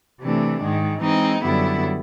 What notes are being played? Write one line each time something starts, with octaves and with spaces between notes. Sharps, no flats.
C3 E3 A3 D4
G#2 D#3 G#3
E3 G#3 C4 D#4
F#2 D3 G3 B3 E4